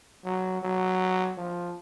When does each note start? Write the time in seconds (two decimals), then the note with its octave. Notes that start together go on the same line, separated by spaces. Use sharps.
0.25 F#3
0.62 F#3
1.37 F3